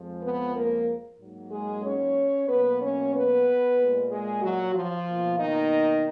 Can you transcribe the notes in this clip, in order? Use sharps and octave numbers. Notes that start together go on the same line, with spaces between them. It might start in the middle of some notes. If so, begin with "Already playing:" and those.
Already playing: F2 F3 G#3
B3 B4
A#3 A#4
G#2 F#3 A#3
G#3 G#4
C#4 C#5
B2 F#3 A#3 B3 B4
C#4 C#5
B3 B4
A#2 G#3
G#3 G#4
F#3 F#4
F3 F4
B2 A#3
D#3 D#4